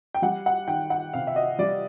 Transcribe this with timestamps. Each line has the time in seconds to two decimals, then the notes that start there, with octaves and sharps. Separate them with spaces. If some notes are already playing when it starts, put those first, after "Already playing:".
0.14 G5
0.22 G3 F#5
0.46 F#5
0.68 D#3 G5
0.90 F#5
1.13 C3 F5
1.27 E5
1.36 D#5
1.59 G3 D5